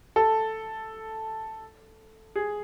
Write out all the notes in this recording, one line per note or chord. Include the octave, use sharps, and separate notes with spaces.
A4
G#4